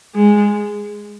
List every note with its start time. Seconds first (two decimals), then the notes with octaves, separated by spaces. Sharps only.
0.15 G#3